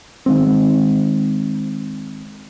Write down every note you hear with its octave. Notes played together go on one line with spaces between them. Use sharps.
D#3 G#3 C4